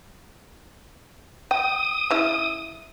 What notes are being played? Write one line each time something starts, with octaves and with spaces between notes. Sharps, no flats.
G5 D#6
C#3 E4 E5